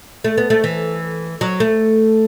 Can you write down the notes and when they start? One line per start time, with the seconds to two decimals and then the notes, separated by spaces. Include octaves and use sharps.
0.24 A3
0.38 B3
0.50 A3
0.64 E3
1.41 F#3
1.60 A3